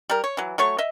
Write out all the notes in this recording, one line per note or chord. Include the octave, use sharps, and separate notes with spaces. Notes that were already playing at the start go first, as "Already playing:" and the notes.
G3 A#4
C#5
E3 F#3
F#3 A3 C#5 C#6
D#5 E5